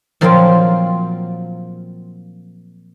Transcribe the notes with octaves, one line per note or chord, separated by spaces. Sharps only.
A#2 F3 F#3 A#3 C4 F4